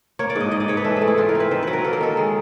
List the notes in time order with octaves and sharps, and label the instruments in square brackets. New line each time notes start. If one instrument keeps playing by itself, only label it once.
[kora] A#3 C#5
D5
G#2 D#5
G#2 D#5
D5
G#2 C#5
B4
E3 A4
G#4
A3
E4
E3 F4
A#4
C4
B4
D#3 C5
F#3 B4
A#4
A#3 A4
A#4
D#3 A4
G#3